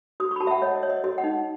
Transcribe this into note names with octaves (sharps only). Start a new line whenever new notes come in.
F#4 D#6
C#6
B5
F#4 A5
E5
F#5
C#5 D#5
D#5
C#5
D#5
F#4 D#5
F#5
D#4